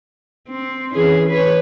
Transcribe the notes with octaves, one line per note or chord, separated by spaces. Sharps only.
C4
E3 C#4 G#4
B4 C#5